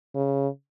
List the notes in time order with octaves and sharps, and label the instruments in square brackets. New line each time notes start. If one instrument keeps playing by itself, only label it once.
[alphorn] C#3